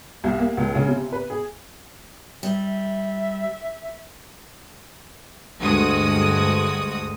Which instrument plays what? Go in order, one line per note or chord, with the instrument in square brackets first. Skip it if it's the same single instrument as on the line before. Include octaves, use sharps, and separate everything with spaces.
[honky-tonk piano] C2
A#3
C#2
C#3
C3
B4
G#4
[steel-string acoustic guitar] G3 [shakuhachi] E5
[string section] D2 G2 G#3 F#4 D#6